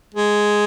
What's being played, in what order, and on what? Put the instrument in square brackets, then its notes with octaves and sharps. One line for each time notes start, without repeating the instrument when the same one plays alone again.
[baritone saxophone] G#3